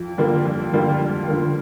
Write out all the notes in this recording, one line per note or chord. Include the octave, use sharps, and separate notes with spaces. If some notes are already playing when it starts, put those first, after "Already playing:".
Already playing: F2
D3 G3 A#3 F4
F2
D3 G3 A#3 F4
F2
D3 G3 A#3 F4